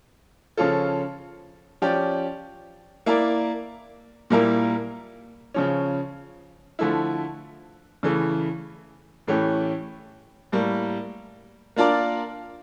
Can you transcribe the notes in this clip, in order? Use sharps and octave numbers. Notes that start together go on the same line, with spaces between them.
C#3 F3 C#4 F4 A4
F3 C#4 G4 D5
A#3 E4 A#4 D5
A#2 G3 A#3 E4 A#4
C#3 F3 C#4
D3 F3 A3 E4
C#3 E3 A3
A2 E3 A3 C#4 G4
A2 G3 A#3
A#3 D4 F4 A#4 D5